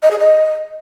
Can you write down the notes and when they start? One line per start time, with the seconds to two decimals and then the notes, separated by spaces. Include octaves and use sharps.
0.02 D#5
0.11 G#4
0.19 D#5